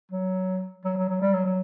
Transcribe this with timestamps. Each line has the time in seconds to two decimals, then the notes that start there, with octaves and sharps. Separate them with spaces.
0.11 F#3
0.85 F#3
0.97 F#3
1.09 F#3
1.21 G3
1.33 F#3
1.45 F#3